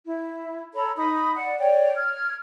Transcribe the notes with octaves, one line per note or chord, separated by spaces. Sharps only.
E4
A4 C#5 A#5 B5
D#4 B5 D#6
D5 F#5
C#5 D5 G5
F6 G#6